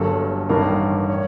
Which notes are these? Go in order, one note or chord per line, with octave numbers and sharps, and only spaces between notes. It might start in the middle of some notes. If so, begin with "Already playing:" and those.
Already playing: G1 G2 D3 F#3 A#3 A4
A1 G2 D#3 G3 A#3 A#4
C#5